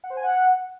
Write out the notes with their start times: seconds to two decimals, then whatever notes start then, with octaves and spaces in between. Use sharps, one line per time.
0.04 F#5
0.10 C5
0.17 G#5
0.23 F#5